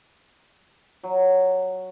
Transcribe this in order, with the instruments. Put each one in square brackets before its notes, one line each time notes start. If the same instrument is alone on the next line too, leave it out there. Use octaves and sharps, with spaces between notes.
[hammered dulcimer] F#3